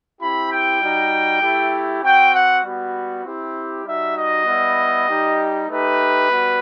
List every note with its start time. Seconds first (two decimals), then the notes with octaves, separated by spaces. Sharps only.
0.18 C4 E4 G4 B5
0.49 G5
0.80 G3 D#4 F#4
1.41 A3 E4 G4
2.01 C4 F#4 G5
2.33 F#5
2.63 G3 B3 F#4
3.24 C4 E4 G4
3.84 G3 D#4 F#4 E5
4.14 D#5
4.45 G3 B3 E4
5.07 G3 D#4 G4
5.68 A3 D#4 G4 B4
6.28 G3 B3 F#4